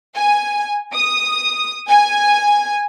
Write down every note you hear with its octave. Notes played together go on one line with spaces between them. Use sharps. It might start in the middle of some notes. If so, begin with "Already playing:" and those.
G#5
D#6
G#5